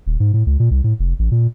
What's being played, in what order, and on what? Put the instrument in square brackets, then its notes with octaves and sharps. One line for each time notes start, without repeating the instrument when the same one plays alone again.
[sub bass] D#1
G#2
A2
C#2
A#2
C2
A2
F1
A1
A#2